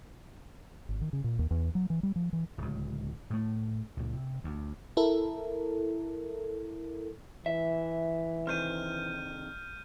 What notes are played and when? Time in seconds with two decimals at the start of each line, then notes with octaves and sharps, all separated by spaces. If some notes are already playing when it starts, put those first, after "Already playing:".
0.89 G#1
1.01 D#3
1.13 C#3
1.24 A#2
1.39 D#2
1.51 E2
1.75 F#3
1.90 E3
2.03 G3
2.16 F3
2.33 E3
2.58 D1 C#2
3.30 A2 A3
3.97 C#2 A#2
4.13 C3
4.44 D2
4.97 E4 A4 A#4
7.46 E3 E5
8.47 C3 D#3 F6 G6 D#7